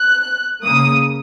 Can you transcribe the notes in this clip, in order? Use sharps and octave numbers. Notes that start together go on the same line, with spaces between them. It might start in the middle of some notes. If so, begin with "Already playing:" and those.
Already playing: F#6
C#3 A#3 D#6